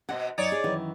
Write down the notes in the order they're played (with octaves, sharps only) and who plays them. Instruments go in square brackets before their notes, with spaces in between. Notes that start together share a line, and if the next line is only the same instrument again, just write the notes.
[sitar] B2 [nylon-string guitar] C5 D#5 F#5
[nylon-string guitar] F#2 [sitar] D#4 C#5 D5
[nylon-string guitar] G#4
F#2 D#3 E3